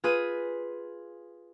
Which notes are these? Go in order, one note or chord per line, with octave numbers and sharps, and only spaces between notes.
F4 G#4 B4 D#7